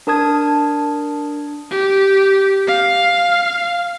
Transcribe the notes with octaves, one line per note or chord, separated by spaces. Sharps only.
D4 A#4 A5 D#6 G#6
G4
F5